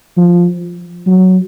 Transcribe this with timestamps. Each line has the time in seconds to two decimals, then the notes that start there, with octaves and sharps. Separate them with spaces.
0.17 F3
1.07 F#3